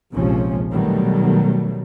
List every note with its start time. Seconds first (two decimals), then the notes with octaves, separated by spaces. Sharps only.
0.12 A#1 D#2 C3 F3 G#3 C#4
0.73 B2 D#3 F#3 G3 A3